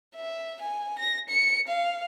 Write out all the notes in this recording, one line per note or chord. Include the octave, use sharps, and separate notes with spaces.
E5
G#5
A#6
C#7
F5